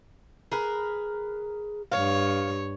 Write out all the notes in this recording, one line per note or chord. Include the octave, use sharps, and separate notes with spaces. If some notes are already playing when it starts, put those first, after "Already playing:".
G#4 A#4 B4
G2 C#5 F5